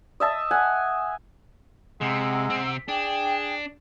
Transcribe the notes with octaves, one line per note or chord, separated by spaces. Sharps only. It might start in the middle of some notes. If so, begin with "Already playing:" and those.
D#5 E5 A5
F#5 G#5
C3 G#3 F#5 A#5 E6
C3 C4
D4 G#4 G5